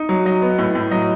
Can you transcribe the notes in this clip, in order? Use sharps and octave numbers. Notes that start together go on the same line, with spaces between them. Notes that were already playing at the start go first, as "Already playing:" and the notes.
Already playing: D#4
F#3
F#3 D#5
B3
A2
A2
F#3 D#5